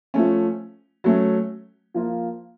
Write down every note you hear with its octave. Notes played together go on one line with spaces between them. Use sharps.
F3 A3 C#4
F#3 A3 C#4
F3 A#3 F4